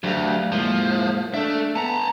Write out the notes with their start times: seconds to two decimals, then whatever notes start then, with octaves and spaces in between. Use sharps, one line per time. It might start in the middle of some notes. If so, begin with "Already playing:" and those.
0.04 D2 F#3 G4 F5
0.52 F3 G#3 A#3 E4
1.34 D4 A4 E5
1.76 B3 A5 A#5